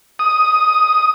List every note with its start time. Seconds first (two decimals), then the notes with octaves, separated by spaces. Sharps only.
0.19 D#6